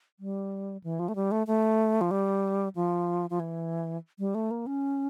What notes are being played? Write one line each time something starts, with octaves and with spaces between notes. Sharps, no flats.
G3
E3
F3
A3
G3
A3
A3
F3
G3
F3
F3
E3
G3
A3
A#3
C#4